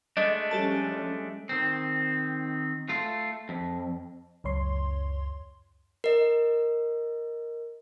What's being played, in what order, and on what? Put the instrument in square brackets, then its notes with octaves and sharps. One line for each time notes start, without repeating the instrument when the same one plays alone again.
[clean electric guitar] G#3 A3 D4 [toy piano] D#5
[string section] F3 G3 C#4 [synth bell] G4 A4 A5
[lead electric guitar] D#3 C4
A3 F4
F2
[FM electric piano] C#2 F#2 C#5 C6
[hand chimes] A#4 D#5